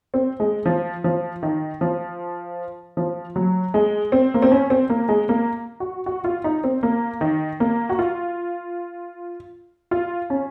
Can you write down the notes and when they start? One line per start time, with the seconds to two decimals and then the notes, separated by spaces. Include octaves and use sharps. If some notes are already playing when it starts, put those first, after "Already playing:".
0.14 C4
0.40 G#3
0.65 F3
1.04 F3
1.43 D#3
1.81 F3
2.97 F3
3.36 F#3
3.74 G#3
4.12 C4
4.34 A#3
4.42 C4
4.52 C#4
4.70 C4
4.90 A#3
5.09 G#3
5.29 A#3
5.80 F#4
6.06 F#4
6.24 F4
6.44 D#4
6.64 C4
6.83 A#3
7.21 D#3
7.60 A#3
7.89 F#4
7.99 F4
9.91 F4
10.30 C#4